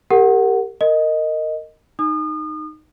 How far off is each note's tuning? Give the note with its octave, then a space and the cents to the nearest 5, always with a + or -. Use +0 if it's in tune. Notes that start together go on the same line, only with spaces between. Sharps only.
G4 +10 A#4 -25 F#5 +0
A#4 -20 D#5 +0
D#4 -10 D#6 -35